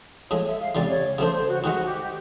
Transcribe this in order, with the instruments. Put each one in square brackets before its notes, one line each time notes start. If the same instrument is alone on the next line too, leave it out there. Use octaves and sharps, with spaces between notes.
[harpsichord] A2 F3 G#3 [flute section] C#5
[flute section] E5
F5
[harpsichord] C#2 C3 E3 [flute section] D5
[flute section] C#5
[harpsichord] C#3 F3 A3 D4 [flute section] C5
[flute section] C5
F#4
[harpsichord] G#2 D#3 G#3 [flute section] F#4
[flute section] G4
G4